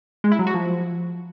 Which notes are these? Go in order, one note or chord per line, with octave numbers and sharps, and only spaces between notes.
G#3
E4
F#3
F#4
F3